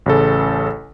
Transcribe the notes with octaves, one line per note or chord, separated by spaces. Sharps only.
A1 C#3 A4